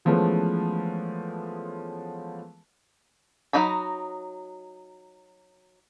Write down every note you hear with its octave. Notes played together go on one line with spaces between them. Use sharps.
E3 F3 G#3 A3 B3 C#4
F#3 D#4 D#5 B5